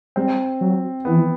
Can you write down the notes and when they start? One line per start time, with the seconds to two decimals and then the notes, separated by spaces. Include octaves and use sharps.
0.16 G3 C4
0.61 F#3
1.05 E3 B3